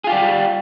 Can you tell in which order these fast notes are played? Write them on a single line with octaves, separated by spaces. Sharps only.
G#4 F4 G4 G3